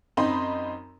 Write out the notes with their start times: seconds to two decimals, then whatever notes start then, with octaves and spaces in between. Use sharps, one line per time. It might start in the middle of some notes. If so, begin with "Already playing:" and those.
0.17 F#2 C4 D#4 B5 C6